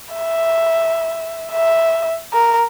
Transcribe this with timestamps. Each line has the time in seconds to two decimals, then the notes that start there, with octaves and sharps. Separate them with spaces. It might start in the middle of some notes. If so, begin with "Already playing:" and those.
0.14 E5
1.52 E5
2.33 A#4